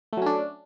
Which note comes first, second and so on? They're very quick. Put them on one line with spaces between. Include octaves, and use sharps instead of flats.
A3 F#3 C#4 D4